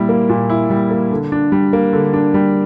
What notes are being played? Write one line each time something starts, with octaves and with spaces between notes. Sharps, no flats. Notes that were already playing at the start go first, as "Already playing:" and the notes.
Already playing: A#2 G3 E4
A#3
A#2
E4
G3
A#3
D3
D4
G3
A#3
D3
D4
G3